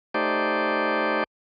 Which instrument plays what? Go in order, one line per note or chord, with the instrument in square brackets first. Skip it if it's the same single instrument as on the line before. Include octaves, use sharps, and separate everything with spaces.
[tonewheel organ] A3 D#4 G4 C5 D5